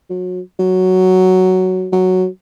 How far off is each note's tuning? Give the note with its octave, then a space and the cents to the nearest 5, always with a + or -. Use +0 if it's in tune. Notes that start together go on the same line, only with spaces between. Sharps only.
F#3 -25
F#3 +5
F#3 +0